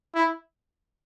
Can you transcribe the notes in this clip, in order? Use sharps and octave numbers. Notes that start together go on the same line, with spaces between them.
E4